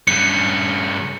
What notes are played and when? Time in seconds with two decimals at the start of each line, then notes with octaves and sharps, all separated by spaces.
0.07 G2 C#3 C#7